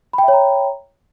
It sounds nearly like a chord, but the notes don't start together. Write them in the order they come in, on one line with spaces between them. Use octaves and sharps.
B5 G5 E5 C#5 A#5